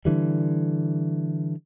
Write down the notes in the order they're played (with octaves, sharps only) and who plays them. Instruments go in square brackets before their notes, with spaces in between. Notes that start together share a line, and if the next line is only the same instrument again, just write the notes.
[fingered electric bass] D3 E3 G3